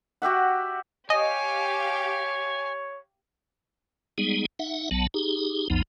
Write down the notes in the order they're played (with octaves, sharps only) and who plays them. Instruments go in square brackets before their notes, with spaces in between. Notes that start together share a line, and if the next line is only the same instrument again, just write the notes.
[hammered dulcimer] F#4 G4 E5 F#5
[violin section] G4 F5 [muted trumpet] C#5 [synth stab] D#5 [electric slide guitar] G#5
[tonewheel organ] G3 G#3 B3 D#4 G#4
D#4 E5 F#5
B1 F#3 B3 A5
D#4 G4 G#4
B1 F2 F3 B3 D#4